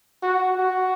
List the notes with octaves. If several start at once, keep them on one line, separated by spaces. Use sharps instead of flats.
F#4
F#4